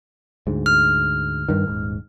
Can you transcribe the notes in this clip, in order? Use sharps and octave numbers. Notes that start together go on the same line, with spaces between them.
D2 G#2
F6
G2 D#3
D#1 G#2